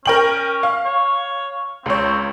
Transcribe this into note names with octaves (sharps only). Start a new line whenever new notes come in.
C#4 A#4 G5 F#7
F5
C#5
C#2 C4 C#5